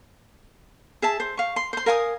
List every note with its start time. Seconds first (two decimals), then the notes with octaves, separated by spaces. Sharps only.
1.02 G#4 E5 A5
1.20 C5
1.37 F5 C#6
1.56 C6
1.73 C5 C6
1.86 A#4 F5 G#5 D#6